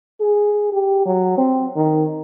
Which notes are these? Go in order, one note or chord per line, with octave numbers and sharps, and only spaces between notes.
G#4
G4
F#3
C4
D#3